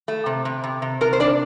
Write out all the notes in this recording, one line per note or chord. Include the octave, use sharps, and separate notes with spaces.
A3
C3
C3
C3
C3
C3 A#4
C5
D4 D5